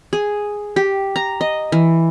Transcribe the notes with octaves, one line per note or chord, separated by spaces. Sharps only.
G#4
G4
A#5
D#5
E3